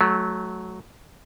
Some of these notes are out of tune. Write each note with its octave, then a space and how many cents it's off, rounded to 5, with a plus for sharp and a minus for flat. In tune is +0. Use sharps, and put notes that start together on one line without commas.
F#3 +0 A3 -20